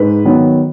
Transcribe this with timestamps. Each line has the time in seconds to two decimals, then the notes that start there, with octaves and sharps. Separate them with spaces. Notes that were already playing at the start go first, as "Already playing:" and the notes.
Already playing: G#2 B4
0.25 D#3 F#3 B3